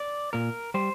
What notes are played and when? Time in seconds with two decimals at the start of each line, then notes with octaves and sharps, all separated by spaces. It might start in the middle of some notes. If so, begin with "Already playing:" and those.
Already playing: D5
0.33 A#2 A#4
0.74 G3 C5